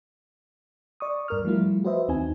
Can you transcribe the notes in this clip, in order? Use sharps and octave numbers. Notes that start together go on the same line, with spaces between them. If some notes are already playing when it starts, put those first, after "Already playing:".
D5 C#6 D#6
G2 A#4 F6
F3 G3 A3 E4 F4
F#4 B4 C5 D#5 E5
D#2 C4 D#4 G#5